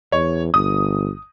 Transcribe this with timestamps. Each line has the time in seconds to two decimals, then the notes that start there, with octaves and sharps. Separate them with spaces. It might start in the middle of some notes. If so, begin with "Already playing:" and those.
0.12 E2 C#5
0.54 G1 D#6